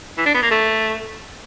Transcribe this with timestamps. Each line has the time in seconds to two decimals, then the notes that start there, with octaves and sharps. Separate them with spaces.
0.17 E3
0.26 D4
0.34 B3
0.42 A#3
0.51 A3